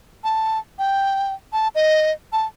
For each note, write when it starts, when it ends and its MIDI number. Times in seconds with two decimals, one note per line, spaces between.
0.24 0.59 81
0.79 1.33 79
1.53 1.68 81
1.75 2.12 75
2.33 2.46 81